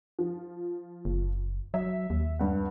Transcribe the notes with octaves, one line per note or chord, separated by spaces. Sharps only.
F3
F#1
F#3 E5
D#2
G2 F#5